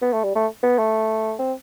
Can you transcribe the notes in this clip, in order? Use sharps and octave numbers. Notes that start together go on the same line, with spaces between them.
B3
A3
G3
A3
B3
A3
C4